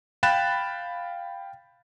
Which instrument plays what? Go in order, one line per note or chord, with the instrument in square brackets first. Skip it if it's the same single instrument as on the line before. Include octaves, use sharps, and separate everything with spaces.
[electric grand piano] F5 G5 B5 F#6 A6 E7